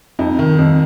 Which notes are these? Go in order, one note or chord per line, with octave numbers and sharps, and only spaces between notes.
F2 D#4
D#3
F2